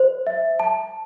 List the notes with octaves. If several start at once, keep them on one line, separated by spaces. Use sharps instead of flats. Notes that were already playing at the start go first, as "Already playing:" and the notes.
Already playing: C5
E5
A5